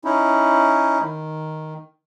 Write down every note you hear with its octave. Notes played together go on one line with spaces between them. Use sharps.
C#4 D#4 E4
D#3